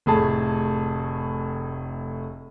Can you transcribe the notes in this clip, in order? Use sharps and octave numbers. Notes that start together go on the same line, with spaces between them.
F1 A2 G#4 A5